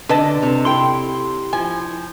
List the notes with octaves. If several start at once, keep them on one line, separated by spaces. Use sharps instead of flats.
D3 B4 D#5 A5
C3
E4 A4 G5 C6
F3 G#5